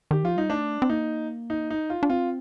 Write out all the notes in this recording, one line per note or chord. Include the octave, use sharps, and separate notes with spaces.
D#3 G4
F3 F4
G3 D#4
A3 D4
C4
A#3 D#4
D#4
D#4
F4
D4
C4 F4